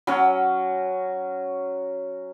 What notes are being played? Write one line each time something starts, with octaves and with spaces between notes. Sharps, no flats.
F#3 C#4